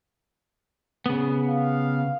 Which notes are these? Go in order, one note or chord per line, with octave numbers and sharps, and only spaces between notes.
C#3 B3
F5